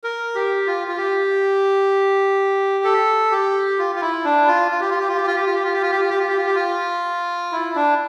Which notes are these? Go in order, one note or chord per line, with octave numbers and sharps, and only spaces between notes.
A#4
G4
F4
F4
G4
A4
G4
F4
F4
E4
D4
F4
F4
G4
F4
G4
F4
G4
F4
G4
F4
G4
F4
G4
F4
G4
F4
G4
F4
G4
F4
G4
F4
E4
D4